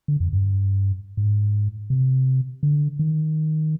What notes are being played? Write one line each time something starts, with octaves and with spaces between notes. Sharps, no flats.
D3
F2
G2
G#2
C3
D3
D#3